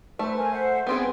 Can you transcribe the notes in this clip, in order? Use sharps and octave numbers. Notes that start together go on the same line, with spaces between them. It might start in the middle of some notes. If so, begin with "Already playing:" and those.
A3 B4 C5
A#4 C5 G#5
C5 E5 F#5
B3 C4 G#4 G5